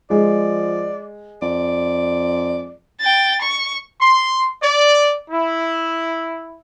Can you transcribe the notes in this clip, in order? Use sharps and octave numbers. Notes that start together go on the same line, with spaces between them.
F3 G#3 D5
F2 D5
G5 A6
C#6
C6
D5
E4